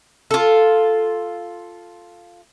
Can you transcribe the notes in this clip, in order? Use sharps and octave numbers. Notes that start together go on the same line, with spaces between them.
F4 A4